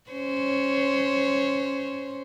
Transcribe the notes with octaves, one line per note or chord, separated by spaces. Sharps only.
C#4 C5 C#5